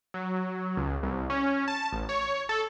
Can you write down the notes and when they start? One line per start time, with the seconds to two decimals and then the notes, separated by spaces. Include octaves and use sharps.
0.14 F#3
0.77 C#2
1.03 C2
1.30 C#4
1.68 A5
1.92 A1
2.09 C#5
2.49 A4